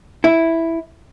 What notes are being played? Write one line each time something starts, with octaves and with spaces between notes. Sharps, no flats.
E4